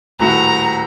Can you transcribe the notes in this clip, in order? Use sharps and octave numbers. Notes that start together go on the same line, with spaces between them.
D#1 A2 F#4 A#5